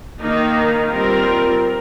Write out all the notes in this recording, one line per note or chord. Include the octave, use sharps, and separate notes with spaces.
D#3 A#3 D#4
G3 C4 F4 A#4